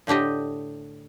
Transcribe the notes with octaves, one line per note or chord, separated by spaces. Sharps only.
A2 D3 D4 G4 D#5